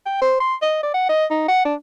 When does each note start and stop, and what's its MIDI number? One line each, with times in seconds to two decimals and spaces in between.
0.06 0.18 79
0.22 0.37 72
0.40 0.54 84
0.62 0.78 75
0.83 0.94 74
0.94 1.04 78
1.09 1.25 75
1.31 1.46 63
1.48 1.64 78
1.65 1.75 62